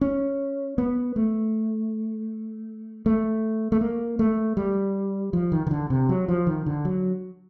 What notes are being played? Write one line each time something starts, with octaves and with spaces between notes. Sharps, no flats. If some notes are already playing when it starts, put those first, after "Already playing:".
C#4
B3
A3
A3
A3
A#3
A3
G3
F3
D#3
D#3
D3
C3
F#3
F3
D#3
D3
F#3